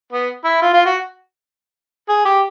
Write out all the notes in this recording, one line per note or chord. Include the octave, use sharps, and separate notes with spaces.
B3
E4
F4
F4
F#4
G#4
G4